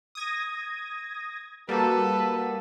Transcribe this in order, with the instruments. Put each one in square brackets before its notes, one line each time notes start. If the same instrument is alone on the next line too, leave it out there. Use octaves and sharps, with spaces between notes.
[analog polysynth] D#6 G#6 A#6
[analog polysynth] G3 A#3 F#4 [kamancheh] A4 B4